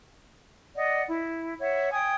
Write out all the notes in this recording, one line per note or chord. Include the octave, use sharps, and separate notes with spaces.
D5 D#5 F#5
E4
C#5 E5 F#5
G5 G#5 D#6 G#6